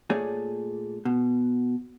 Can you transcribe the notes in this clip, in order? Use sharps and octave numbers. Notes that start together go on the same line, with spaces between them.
A#2 A3 G#4 C#5 D5 G#5
B2